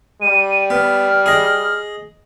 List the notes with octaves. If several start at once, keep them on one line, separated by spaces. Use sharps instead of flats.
G3 D#7
B3 F6
G#4 D#5